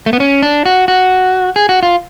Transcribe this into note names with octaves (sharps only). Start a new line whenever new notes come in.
A3
B3
C#4
D4
F#4
F#4
G#4
F#4
F4